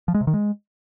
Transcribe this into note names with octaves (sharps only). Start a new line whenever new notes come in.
F3
G#3
C3
D#3
G#3